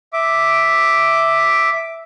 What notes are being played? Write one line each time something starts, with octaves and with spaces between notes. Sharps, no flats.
E5 D6